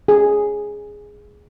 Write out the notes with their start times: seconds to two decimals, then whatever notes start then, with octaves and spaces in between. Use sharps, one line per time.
0.08 G#4